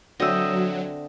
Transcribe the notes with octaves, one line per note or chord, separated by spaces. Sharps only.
D3 F#3 C4 D#5 E5